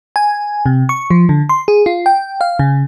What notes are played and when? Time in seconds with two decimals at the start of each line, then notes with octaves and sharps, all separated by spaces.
0.16 G#5
0.66 C3
0.89 C#6
1.10 F3
1.29 D3
1.49 C6
1.68 G#4
1.86 F4
2.06 G5
2.41 F5
2.59 C#3